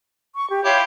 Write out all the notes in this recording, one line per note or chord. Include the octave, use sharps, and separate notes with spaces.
C#6
G4
E4 F4 G4 C#5